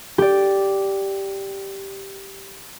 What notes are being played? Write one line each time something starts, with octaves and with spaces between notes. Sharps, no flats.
G4 D5